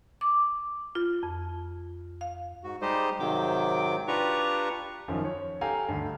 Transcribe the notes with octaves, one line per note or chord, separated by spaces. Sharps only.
D6
F4
F2
F5
G#2 F#4
G3 G#3 D#4 G4 C5 D#5
G#2 C3 D#3 F#3 G5 D6
D4 F4 G4 B4 A#5 C#6
F#2 D#3 F3
C#5
G4 A4 F5 G5 G#5 A#5
D2 G2